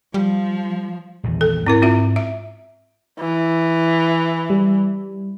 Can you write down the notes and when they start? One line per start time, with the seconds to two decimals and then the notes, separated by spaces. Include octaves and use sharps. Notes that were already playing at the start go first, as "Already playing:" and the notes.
0.14 F3 G3
1.24 A#1 E2 D#3
1.41 A4
1.67 G#2 C4 C#4 E4 A#4
1.82 C4 F4 E5
2.16 E5
3.20 E3
4.50 G3